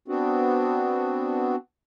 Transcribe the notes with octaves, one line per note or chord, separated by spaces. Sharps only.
B3 C4 D4 F#4